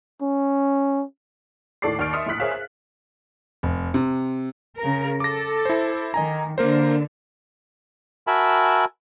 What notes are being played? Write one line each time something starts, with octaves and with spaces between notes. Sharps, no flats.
C#4
D#2 A2 A4 D5 D6 C7
D#2 D5 D6 F6 A6 D7
E5 C6 D#6 F6 C#7
A#1 A2 E4 D#6 F#6 B6
G#4 A#4 C5 C#5 E5 F5
F#6
F1
C3
C#3 A#4
A4 D6 A#6
E4 C5
D#3 D#5 G#5 A#5
D3 A#3 A#4 C5
F#4 A#4 E5 G#5 A5 B5